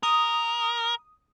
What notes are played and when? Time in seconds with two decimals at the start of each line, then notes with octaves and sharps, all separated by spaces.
0.03 A#4 D#6